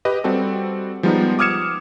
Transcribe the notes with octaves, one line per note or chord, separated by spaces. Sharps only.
G4 B4 D#5
G3 C4 F#4 A4
F3 G3 G#3 B3 D#4
D6 D#6 F6 G#6 C#7 E7